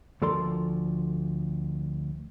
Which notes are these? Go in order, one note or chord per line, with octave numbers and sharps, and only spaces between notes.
D2 F3 A4 A#4 D5 C6